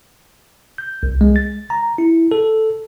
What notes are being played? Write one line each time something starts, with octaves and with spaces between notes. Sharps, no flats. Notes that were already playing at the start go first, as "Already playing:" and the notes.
G6
C2
G#3
A6
A#5
E4
A4